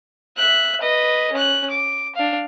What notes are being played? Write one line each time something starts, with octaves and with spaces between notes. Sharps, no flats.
E5 F#6
B4 D#5
C#4 F#6
D6
D4 F5